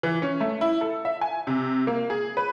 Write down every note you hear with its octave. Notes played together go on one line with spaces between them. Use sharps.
E3
C#4
A3
E4
A4
E5
G#5
C3
A#3
G#4
B4